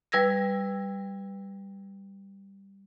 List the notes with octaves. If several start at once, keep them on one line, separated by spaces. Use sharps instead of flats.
G3 B4 E6 G#6 A#6